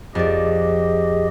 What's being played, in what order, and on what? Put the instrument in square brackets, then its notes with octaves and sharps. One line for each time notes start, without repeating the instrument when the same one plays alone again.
[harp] F2 D5 [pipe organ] G4 G#4 D#5